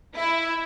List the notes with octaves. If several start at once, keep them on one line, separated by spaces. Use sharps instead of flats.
E4